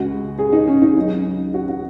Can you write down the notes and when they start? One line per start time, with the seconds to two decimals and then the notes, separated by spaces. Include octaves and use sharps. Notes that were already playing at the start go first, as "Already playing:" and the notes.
Already playing: C#2 C#3 G#3 F#4
0.39 G#4
0.52 D#4
0.68 C#4
0.82 D#4
0.97 C#2 C#3 F#3 D#4
1.54 F#4
1.69 F#4